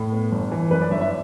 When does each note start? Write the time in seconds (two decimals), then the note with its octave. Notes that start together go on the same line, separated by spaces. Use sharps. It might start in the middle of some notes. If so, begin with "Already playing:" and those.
Already playing: A2
0.12 B3
0.32 G1
0.52 E3
0.71 F#2 B4
0.81 D5
0.91 G1 E5
1.01 E5